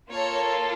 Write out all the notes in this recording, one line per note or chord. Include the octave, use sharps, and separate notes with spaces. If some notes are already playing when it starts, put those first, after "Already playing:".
A#3 F4 A4 C#5